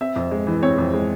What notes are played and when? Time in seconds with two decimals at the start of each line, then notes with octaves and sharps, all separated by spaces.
0.01 C4 E5
0.16 F2
0.31 G#3
0.47 E3
0.62 C4 C#5
0.78 F2
0.94 G#3